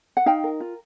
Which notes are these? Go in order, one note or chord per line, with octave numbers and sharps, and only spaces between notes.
F#5
D#4 F5 G5
A#4
F4